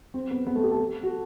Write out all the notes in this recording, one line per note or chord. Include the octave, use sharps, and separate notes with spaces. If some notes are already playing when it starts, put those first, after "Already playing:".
C4
B3
B3
A3
G4
A4
F#4